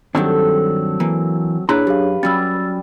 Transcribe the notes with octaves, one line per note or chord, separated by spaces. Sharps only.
G2 D#3 F#3 C4 D4 A4
E3 A#3
A#2 D4 E4 G#4 B4 C#5 A#5
F#2 G4 F5
F#3 G3 C#4 E6 A6